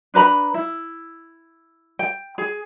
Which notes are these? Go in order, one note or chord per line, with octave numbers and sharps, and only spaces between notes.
D4 B4 A#5 B5
E4
G5
G#4